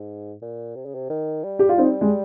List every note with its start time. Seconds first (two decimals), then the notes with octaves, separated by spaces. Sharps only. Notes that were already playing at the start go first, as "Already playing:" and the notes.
Already playing: G#2
0.42 A#2
0.75 C3
0.85 C#3
0.95 C3
1.10 D#3
1.44 G3
1.59 G4
1.69 F4
1.78 C4 D#4
2.01 G#3